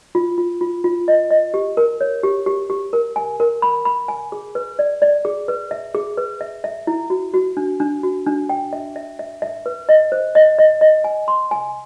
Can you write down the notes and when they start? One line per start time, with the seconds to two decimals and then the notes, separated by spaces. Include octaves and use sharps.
0.15 F4
0.38 F4
0.61 F4
0.84 F4
1.08 D#5
1.31 D#5
1.54 G4
1.77 A#4
2.01 C#5
2.23 G4
2.46 G4
2.70 G4
2.93 A#4
3.16 G#5
3.40 A#4
3.62 B5
3.85 B5
4.08 G#5
4.32 G#4
4.55 B4
4.79 D5
5.02 D5
5.25 G#4
5.48 B4
5.71 E5
5.94 G#4
6.17 B4
6.41 E5
6.64 E5
6.87 E4
7.10 F#4
7.34 F#4
7.57 D4
7.80 D4
8.03 F#4
8.26 D4
8.49 G5
8.73 E5
8.96 E5
9.19 E5
9.42 E5
9.66 B4
9.89 D#5
10.12 C5
10.35 D#5
10.59 D#5
10.81 D#5
11.04 G#5
11.28 C6
11.51 G#5